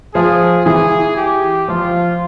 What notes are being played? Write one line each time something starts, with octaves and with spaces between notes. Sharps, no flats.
F3 G#4
E3 G#4
G4
F3 F4